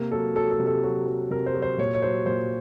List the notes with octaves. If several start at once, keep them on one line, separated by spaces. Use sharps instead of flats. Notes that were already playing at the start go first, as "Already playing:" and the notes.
Already playing: C3 A#3
F#3 A4
F#3 A4
A4
C3
A4
F#3 F#4
F#3
C3 A#4
C5
F#3
C5
A#2 C#5
C#5
F#3 C5
A#2 C5